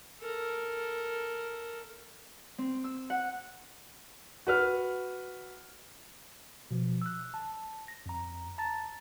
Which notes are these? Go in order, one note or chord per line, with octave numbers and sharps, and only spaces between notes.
A4 A#4
C4
E6
F#5
F#4 B4 F6
B2 F3
E6 F#6
A5
A#6
F2 A#5
A5 A#5 A6